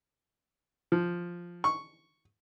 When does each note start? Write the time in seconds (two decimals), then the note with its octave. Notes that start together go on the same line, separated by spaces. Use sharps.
0.92 F3
1.64 C#6